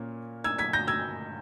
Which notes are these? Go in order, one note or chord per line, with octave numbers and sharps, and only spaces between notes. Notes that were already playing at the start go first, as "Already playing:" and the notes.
Already playing: A#2 A#3 C#4
E6 G#6
G#6 B6
G6 A#6
E6 G#6